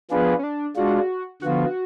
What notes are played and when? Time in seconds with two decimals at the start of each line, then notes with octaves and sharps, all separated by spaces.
0.11 F3 B3 D4 F4 G#4 B4
0.39 C#4
0.44 D4
0.77 G#3 D4 F4 F#4
1.42 D3 F3 B3 F4 F#4